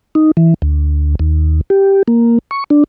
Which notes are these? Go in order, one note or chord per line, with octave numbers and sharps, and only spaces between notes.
D#4
E3
D2
D#2
G4
A#3
C#6
D4